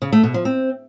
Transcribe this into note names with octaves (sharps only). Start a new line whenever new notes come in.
C#3
A3
B2
F3
C4